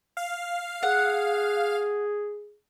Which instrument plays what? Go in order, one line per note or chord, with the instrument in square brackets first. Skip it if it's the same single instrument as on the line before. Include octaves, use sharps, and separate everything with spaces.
[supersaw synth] F5
[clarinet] G#4 [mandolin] F#5